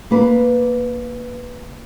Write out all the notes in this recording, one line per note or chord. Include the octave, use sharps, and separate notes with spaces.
A#3 B4